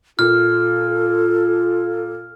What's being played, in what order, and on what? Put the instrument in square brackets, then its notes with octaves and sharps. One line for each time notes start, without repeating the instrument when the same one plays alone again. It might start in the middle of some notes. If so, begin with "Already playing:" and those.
[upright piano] A#2 [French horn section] F4 [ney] A4 [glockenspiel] F6